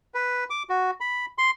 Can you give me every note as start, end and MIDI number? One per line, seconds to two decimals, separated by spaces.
0.14 0.44 71
0.50 0.63 86
0.69 0.91 66
1.00 1.26 83
1.38 1.51 84